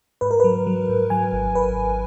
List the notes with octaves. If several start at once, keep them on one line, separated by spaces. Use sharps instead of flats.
G#2 B4
A#4
F#3 B4
F#3
G#2
F#3 G#5
G#1
G#1 B4
G#1